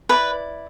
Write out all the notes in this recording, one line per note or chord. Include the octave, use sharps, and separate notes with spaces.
E4 B4 D5 B5